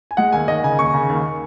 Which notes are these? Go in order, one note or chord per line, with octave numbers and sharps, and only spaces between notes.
G#5
G#3 F#5
D#2 G#5
D#2 D#5
C#3 G#5
D#2 C#6
C#3
D#2